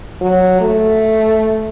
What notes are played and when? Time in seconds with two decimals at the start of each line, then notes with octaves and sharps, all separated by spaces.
0.21 F#3
0.61 A3